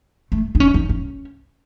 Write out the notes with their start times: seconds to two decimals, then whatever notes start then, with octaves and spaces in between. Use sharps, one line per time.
0.32 A3
0.55 D#4
0.60 C#4
0.74 D#4
0.89 C#4